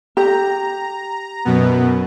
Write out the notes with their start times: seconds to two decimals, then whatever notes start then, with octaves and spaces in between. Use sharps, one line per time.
0.17 G4 A#5
1.45 F#2 B2 B3